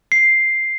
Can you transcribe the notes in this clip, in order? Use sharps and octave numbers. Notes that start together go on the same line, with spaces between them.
C7